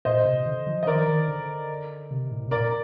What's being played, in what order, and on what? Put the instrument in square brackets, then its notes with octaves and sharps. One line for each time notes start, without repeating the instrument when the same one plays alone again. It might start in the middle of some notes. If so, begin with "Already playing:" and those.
[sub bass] A#2 [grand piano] C5 D#5
[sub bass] C3
D3
F3
[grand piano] D#5
[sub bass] D#3 [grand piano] A#4 D5
[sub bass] D#3
D3
C3
A2
C3
[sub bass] A#2 [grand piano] A#4 D5